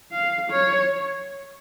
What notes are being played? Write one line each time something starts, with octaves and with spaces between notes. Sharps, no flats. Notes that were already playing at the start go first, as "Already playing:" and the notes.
F5
C#5